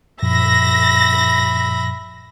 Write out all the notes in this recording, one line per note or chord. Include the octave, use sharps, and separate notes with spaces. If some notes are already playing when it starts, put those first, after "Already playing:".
F#2 A#2 F3 E5 B5 A#6